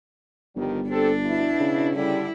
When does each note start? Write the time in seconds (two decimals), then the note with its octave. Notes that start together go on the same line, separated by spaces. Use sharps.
0.56 G1 D#3 F3 G3
0.89 C4 D4 G4 A4
1.25 B2 E4
1.60 C#3
1.95 D3 G3 E4